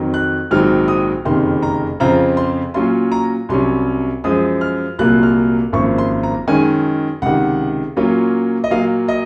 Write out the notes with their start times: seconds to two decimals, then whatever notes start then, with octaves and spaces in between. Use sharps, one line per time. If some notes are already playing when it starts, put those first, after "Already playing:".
Already playing: F2 D#3 F#3
0.14 F#6
0.51 A#1 G#2 D#3 F#3 C4 F6
0.88 D#6
1.25 F#1 F2 C3 D#3 C6
1.62 A#5
2.00 F2 C#3 F3 C4 F4 A#5
2.37 C6
2.74 A#2 F#3 C#4 F4 C6
3.12 A#5
3.49 C2 C3 F#3 C#4 C6
4.24 F#2 F3 G#3 D#6
4.61 F6
4.99 C2 A#2 F#3 A#3 F4 F#6
5.23 F6
5.72 G#1 F#2 F3 A#3 C#6
5.98 C6
6.23 A#5
6.48 F#2 D#3 G#3 C#4 G#5
7.22 C#2 C3 D#3 F#5
7.97 A#2 F#3 A#3 C#4 F4
8.64 D#5
8.71 A#2 F#3 A#3 F5
9.08 D#5